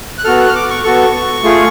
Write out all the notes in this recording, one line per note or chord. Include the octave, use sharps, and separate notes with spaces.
F#6
B3 F#4 A4 F6
F#6
F6
D6
C#6
B3 F#4 A4 C#6
A3 F4 G#4